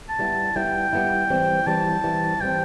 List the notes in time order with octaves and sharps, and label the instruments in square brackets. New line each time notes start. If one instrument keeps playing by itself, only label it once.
[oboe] A5
[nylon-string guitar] G3 B3 E4
[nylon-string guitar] G3 B3 E4 [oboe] G5
[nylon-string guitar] G3 B3 E4
E3 G3 C4
[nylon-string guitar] E3 G3 C4 [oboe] A5
[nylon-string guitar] E3 G3 C4
[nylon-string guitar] E3 G3 C4 [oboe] G5